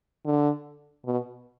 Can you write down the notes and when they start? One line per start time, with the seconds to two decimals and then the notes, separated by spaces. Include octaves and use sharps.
0.25 D3
1.05 B2